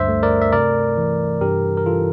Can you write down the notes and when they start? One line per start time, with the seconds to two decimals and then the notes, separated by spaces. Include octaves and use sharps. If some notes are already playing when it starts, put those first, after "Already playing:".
Already playing: D2 G2 C5 E5
0.09 A3
0.23 A#4 D5
0.42 E5
0.52 C3 A#4 D5
0.97 E3
1.41 G2 G4 A#4
1.77 A#4
1.86 E3 F4 A4